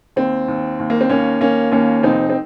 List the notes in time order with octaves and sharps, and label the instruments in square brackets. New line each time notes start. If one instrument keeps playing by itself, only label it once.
[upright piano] D#2 C4
D#2
D#2
A#3
C4
D#2 A#3 C#4
D#2 A#3 C#4
D#2 A#3 C#4
F1 C4 D#4
C4